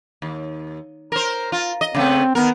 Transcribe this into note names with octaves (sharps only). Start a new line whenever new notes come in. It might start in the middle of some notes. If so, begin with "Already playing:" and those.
D#2
A#4 C5
F4
D#5
C#3 A3 B3 C4
D#3 B3 A#4